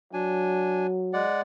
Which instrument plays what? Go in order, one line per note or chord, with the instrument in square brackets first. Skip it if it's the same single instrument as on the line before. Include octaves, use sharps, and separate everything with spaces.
[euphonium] F#3 [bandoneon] D4 G#5
[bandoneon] G#3 D5 F#5